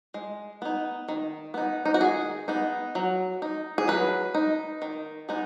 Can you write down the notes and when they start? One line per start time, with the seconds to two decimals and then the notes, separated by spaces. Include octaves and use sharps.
0.14 G#3
0.62 B3 D#4
1.08 D#3
1.54 B3 D#4
1.85 D#4
1.94 F#4
2.01 D#3 G#4
2.48 B3 D#4
2.95 F#3
3.42 D#4
3.78 G#4
3.88 F#3 B4
4.35 D#4
4.82 D#3
5.29 G#3 B3 D#4